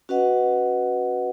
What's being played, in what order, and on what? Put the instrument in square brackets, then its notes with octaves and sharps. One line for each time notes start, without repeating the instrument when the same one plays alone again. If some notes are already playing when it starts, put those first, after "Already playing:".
[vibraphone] C#4 F#4 B4 D#5 F#5